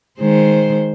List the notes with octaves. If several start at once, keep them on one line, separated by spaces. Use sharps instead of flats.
D#3 G#3 C5